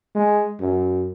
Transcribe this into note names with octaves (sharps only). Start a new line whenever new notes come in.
G#3
F#2